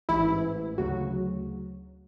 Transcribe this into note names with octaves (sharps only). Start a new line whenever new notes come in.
A1 G#2 E3 E4
D2 C#3 F#3 F#4